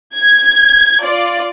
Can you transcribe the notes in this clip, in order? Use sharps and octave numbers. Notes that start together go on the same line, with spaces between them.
G#6
F4 D5